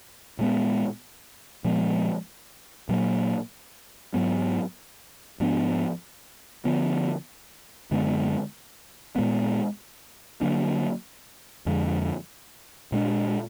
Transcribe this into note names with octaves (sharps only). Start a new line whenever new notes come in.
A#2 G#3 B3
A#2 F3 G#3 B3
A#2 F#3 A#3
G#2 F#3 B3
G#2 F3 B3 D4
D3 F3 B3
F#2 D3 G#3 B3
A#2 G#3 B3
D3 F#3 A#3 D4
F2 D3 G#3
A#2 G#3 D4